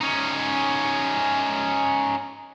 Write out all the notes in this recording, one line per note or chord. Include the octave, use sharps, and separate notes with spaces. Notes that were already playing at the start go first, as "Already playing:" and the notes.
C#4 D#4